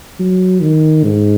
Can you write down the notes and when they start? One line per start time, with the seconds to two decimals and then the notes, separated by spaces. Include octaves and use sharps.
0.19 F#3
0.61 D#3
1.04 G#2